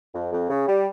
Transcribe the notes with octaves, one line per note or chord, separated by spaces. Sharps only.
F2
F2
C#3
G3